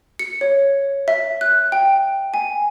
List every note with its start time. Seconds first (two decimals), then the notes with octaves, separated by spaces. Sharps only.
0.19 C#7
0.41 C#5
1.08 E5
1.41 F#6
1.72 G5
2.34 G#5